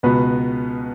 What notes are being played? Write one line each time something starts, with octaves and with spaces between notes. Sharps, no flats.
C#2 B2 B3 F#4 B4